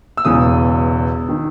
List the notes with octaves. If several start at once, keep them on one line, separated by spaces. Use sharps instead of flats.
E6
E1 E2 C#3 D#6
D#3